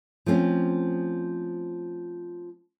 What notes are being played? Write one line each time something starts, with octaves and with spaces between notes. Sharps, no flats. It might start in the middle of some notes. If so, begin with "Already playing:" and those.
F3 A3 C4 C#4